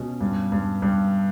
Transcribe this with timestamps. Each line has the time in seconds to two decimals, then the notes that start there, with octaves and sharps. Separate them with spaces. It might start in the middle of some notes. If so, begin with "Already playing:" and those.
Already playing: B2 C#4
0.21 G2
0.52 G2
0.82 G2